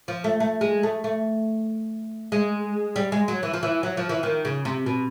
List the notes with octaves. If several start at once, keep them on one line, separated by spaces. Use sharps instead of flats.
F3
A3
A3
G#3
A3
A3
G#3
G3
G#3
F#3
E3
F3
E3
F#3
F3
E3
D#3
C#3
C3
B2